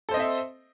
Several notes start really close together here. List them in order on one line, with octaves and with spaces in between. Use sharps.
A4 C5 D#5 C4 E5